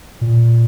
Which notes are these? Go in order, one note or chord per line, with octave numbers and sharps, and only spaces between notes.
A#2